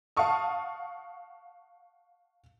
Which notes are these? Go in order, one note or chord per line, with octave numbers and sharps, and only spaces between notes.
F5 F#5 A5 C#6 D#6